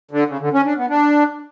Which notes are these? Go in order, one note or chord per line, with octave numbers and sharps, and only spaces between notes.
D3
C#3
D3
C#4
D4
B3
D4